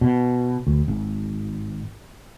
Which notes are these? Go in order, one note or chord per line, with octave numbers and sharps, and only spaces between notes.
B2
D2
G#1